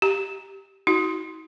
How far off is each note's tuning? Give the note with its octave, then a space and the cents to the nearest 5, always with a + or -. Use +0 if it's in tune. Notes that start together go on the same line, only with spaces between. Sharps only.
G4 +0 A#5 +0
D#4 +45 F#4 +10